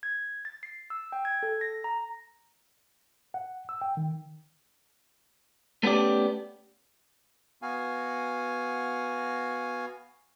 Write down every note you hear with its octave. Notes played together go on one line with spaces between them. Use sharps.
G#6
A6
C7
E6
G5
G#6
A4
A#6
A#5
F#5
E6
G5
D#3
A3 B3 C#4 G4 D5
B3 F#4 F5 G#5